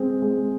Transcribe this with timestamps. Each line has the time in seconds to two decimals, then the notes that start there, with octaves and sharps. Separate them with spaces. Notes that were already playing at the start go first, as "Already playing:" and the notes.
Already playing: G#3 C4
0.22 G#3